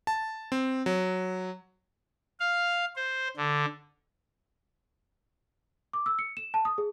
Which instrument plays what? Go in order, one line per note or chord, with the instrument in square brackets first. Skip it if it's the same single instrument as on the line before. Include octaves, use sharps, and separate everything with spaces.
[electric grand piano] A5
C4
F#3
[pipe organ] F5
C5
D3
[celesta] D6
E6
C#7
E7
A5
D#6
G#4